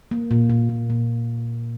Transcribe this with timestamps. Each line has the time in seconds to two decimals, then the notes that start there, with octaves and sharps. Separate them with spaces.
0.11 A#3
0.31 A#2
0.50 A#2
0.69 A#2
0.90 A#2